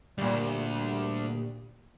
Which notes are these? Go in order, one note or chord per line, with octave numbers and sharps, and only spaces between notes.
D2 A#2 G3